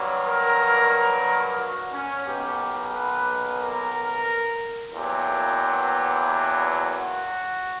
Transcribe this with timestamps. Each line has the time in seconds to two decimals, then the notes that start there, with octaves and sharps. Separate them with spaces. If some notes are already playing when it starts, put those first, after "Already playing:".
Already playing: G2 F#3 A#3
0.26 A#4
1.59 F#4
1.93 C#4
2.26 B1 B2 A#3 G4
2.94 B4
3.60 A#4
4.94 E2 B2 F#3 A#3 G4
6.95 F#4